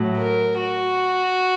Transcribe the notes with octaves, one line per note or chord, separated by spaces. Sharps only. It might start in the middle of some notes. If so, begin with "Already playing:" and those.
Already playing: A2 F#3
A#4
F#4